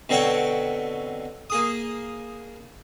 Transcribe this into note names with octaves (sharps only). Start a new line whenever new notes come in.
B2 D3 C4 C#5 G5 C#6
A#3 G#4 D#6